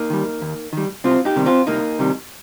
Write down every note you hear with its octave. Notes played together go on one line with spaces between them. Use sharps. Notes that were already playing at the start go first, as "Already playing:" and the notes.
Already playing: A#3 D#4
D#3 G3
D#2
D#3 G3
C2 C4 F4
D#4 G4
C3 D#3 G3
C4 F4
C2 A#3 D#4
C3 D#3 G3